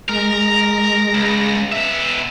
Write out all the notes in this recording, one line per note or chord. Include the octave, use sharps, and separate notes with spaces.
G#3 A#4 A#6
C#2
B2 E5